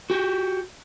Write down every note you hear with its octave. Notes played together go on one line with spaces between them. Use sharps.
F#4 G4